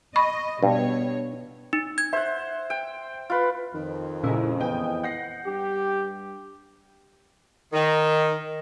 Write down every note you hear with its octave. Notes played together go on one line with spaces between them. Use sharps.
D#5 B5 C#6
G2 B2 C#5
D#4
G#6
C5 E5 F#5
G5
F4 B4
F2 D#3
A#2 C#3 G#3 A#3 E4
E2 B4 D#5 G5 G#5 D#6
F#5 G6 A#6 C7
G2 G4
D#3